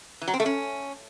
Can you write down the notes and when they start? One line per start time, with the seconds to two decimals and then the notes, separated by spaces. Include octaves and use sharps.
0.22 E3
0.28 F#3
0.34 C4
0.40 A3
0.46 C#4